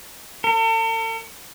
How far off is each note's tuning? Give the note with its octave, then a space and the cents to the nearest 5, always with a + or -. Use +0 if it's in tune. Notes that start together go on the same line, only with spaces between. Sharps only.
A4 +45